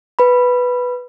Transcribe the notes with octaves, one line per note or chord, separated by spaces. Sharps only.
B4 B5